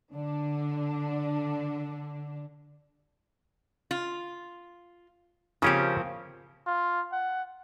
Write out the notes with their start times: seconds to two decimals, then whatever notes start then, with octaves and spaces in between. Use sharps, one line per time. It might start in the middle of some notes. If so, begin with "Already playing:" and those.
0.14 D3 D4
3.91 F4
5.62 C#3 F3 A#3 C4 C#4 G4
6.66 F4
7.12 F#5